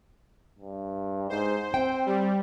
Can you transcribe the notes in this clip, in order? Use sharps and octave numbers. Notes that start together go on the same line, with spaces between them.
G2
G#2 C5
C4 G5
G3